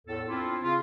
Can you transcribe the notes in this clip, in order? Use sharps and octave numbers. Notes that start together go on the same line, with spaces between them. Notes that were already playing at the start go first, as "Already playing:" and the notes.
E2 A2 A4
C4 D4 E4 F4
C#3 F4